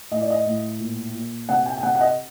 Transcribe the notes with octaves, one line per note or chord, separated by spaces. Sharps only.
A2 D#5
D5
D#5
A2
A#2
A#2
C3 F#5
G5
G5
C3 F#5
F#5
D#5